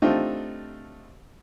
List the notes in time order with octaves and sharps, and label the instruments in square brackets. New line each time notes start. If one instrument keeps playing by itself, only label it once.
[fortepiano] A3 C4 D4 D#4 F4 G4